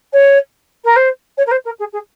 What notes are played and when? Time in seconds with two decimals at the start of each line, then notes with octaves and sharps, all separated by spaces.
0.13 C#5
0.84 A#4
0.96 C5
1.37 C#5
1.46 A#4
1.51 C5
1.65 A#4
1.79 G#4
1.93 G#4